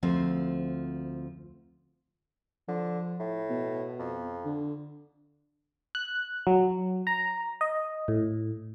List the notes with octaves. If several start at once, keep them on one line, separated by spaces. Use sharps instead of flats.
D2 F3 C4
D3 F3
A2
B2
F2
D3
F#6
F#3
A#5
D#5
A2